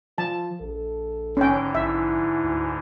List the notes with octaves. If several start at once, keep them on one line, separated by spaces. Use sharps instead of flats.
F3 F4 A5
A#1 A4
G#2 D3 E3 C#4 G5
A#1 E4 E5
D2